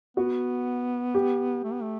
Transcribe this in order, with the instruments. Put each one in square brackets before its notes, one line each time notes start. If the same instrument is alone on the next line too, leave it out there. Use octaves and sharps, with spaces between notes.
[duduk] B3 [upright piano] F#4
[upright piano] G4
[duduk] A3
B3
A3